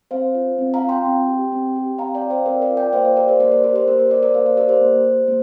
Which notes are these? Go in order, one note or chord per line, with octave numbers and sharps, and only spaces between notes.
C4 C5 F5
F4
C4
F5 A#5
F4
G5 C6
C4
G4
C4
G4
C4 F5 A#5
D5 G5
F4
C5 F5
C4 A#4 D5
A#4 D5
F4
D5 G5
A#3 C5 F5
C5
G4 A#4 D5
C5
A#3 A#4 D5
A#4
G4 C5
C5
A#3 A#4
C5
G4 A#4 D5
A#4 D5
A#3 C5 F5
A#4 D5
G4 A#4 D5
C5
A#3
G4
A#3